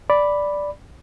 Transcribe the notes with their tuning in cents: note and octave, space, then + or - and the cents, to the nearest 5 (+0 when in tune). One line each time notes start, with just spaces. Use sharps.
D5 +0 B5 +0